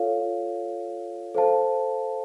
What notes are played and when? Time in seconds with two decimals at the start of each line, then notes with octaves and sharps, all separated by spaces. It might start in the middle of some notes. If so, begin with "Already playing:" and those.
Already playing: F4 A4 C#5 F5
1.34 A4 C5 F5 A5